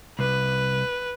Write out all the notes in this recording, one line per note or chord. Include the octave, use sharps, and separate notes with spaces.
C2 B4